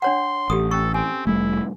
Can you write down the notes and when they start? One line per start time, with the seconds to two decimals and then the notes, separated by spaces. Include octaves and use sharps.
0.02 D4 C#5 F#5 C6
0.50 A1 G4 A4 D#6
0.71 C#4 A4 C#6
0.94 C4 G#5
1.27 F1 G3 A3 E4